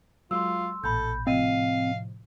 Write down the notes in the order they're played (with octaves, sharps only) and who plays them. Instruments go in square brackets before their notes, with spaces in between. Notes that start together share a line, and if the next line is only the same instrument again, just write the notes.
[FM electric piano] F#3 G#3 [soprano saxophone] F4 [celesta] C6 E6
[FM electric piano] A1 A#2 [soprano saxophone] A4 [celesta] B5 G6
[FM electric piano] A2 C3 F3 [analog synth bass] C4 [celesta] D#5 D#7 [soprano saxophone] F5